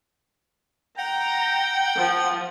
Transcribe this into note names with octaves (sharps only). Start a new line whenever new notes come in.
F#5 G5 A#5
F3